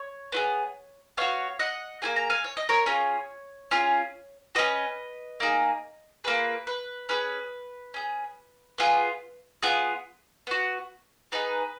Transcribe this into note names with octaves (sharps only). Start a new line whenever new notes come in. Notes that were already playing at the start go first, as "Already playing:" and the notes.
Already playing: C#5
B3 F4 G#4
B3 F#4 C#5 F5
D#5 F#5
A#3 F4 G#4 G#5
A#5
F5 G#5
C#5
D#5
A#4 C#5
C#4 F4 G#4
C#4 F4 G#4
C#4 F#4 B4 D#5
A#3 D#4 G#4
A#3 F4 G#4 B4
B4
C#4 G#4 B4
C#4 G#4
B3 F4 G#4
B3 F4 G#4
B3 F#4
B3 D#4 G#4 B4